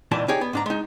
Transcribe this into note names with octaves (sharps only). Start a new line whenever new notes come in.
C#2 A#2 E3 D#4 D5 A5
D#4 G4 G#4 C#5 D5
B3
G#2 D4 A#5
G#3 D#4